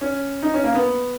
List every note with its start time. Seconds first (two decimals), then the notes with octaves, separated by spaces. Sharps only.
0.01 C#4
0.42 D#4
0.54 C#4
0.64 A#3
0.75 B3